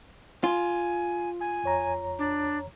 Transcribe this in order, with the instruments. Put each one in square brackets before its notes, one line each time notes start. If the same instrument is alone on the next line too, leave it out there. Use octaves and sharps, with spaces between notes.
[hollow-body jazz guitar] F4 [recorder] G#5
[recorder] G#5
[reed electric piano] F2 C#5 A#5
[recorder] D4